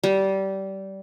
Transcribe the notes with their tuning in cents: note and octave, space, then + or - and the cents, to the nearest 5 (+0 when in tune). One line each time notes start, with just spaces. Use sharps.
G3 -20